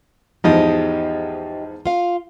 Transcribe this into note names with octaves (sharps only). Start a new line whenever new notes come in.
E2 G#2 F3 D#4 G4 D#5
F4 F5